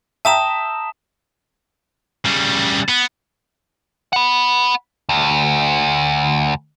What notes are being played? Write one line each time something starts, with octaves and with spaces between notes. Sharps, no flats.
E5 G5 A5 A#5 D#6 E7
C#3 G3
B3
F#5 B5
D2